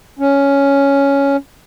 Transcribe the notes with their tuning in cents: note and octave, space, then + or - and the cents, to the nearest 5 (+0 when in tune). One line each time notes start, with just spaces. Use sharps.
C#4 +5